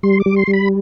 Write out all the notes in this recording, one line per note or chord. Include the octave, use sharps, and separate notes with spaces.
G3 C6
D6
G3
C6
G3
B5